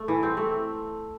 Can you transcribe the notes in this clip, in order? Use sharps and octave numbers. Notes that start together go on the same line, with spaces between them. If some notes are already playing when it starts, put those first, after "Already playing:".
Already playing: A3
E3
C4
A3